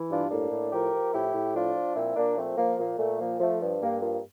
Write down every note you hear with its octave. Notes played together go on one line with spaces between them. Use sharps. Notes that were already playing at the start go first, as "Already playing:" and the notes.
Already playing: E3
G2 D4 F4
A2 A#3 D4
A2
F3 G4 A#4
F3
A2 E4 G4
A2
F3 D4 F4
F3
A#2 C4 E4
A#2 A#3 D4
F3 A3 C4
F3 A#3
A#2 A#3
A#2 A3
F3 A#3
F3 A3
G2
G2 A#3
F3 A#3